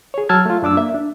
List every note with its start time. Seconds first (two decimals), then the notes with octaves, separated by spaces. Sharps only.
0.14 G#4 C#5
0.29 F#3 A5 E6 F6 G#6
0.46 A3 F4
0.62 F#2 D4 D6 E6
0.77 A#3 E5
0.94 D4